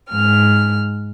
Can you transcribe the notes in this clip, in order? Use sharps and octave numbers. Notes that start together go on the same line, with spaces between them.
G#2 F6